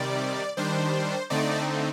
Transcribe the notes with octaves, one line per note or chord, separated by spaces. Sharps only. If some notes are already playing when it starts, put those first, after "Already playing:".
Already playing: C3 D#3 G3 D5
D#3 G3 D4 C5
D3 A3 C4 D#4 D5